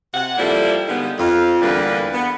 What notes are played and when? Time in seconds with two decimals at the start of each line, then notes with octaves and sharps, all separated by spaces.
0.14 C3 F#5
0.38 F3 G3 A#3 E4 A4 D5
0.88 D3 G3 G#3 A#3 B3 D#4
1.19 F2 F4
1.62 E2 D3 G3 A#3 B4
2.14 B3